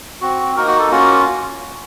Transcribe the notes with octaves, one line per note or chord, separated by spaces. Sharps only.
C4 F#4
A#3 D#4 F#4 A#4
F#4
A4
A#3 C#4 F4 F#4